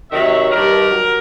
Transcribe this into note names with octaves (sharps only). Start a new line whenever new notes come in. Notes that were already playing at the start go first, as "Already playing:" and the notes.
C3 D#3 F#3 E5
G2 D#3 G3 A#4
F#3